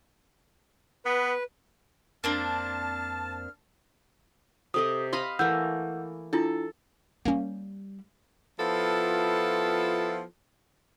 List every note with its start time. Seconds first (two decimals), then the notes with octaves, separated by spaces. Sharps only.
1.05 B3 B4
2.24 F2 A#3 C4 D4 A5 F6
4.74 C3 G4 A4 D#5 D#6
5.13 D#5 F5 B5 C6
5.39 E3 A3 A#3 F#5 E6 G6
6.33 D4 E4 F4 A4
7.25 G3 A#3 C#4
8.59 F3 B3 E4 F4 A4